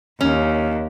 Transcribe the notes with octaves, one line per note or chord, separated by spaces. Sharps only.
D#2 C#4